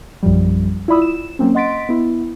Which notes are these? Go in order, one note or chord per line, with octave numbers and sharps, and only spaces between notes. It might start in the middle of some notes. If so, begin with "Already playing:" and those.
A#1 F#2 F3 G3
E4 F4 D5 B5 D#6 E6
E7
F#3 A#3 C4 C#4
D#5 F#5 C6 A6 B6 D7
B3 E4